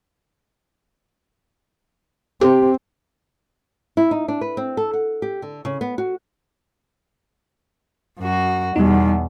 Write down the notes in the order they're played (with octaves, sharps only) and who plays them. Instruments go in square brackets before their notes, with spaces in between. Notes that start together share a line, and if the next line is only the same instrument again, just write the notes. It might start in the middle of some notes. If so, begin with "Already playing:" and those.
[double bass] C4 [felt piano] G4
[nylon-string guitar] E4
D#4
D4
B4
C4
A4
F#5
G4
D3
C#3
B3
F#4
[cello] F#2 F#4
[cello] E2 B2 [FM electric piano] G3 D#4